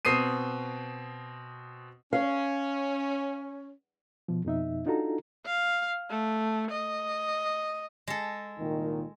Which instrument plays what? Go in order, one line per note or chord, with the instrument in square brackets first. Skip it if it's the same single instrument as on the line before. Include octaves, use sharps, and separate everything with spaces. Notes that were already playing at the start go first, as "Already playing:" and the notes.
[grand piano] B2 C4 D#6 C7 D#7
[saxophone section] C#4 [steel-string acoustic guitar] F5
[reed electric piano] B2 F3
F2 B2 D#4 E5
D4 D#4 F4 F#4 A4 A#5
[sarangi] F5
A3
D#5
[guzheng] G#3 A4
[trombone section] C2 A#2 D#3